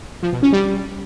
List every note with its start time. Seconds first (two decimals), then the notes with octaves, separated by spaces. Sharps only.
0.23 F3
0.33 B2
0.43 C#4
0.53 G3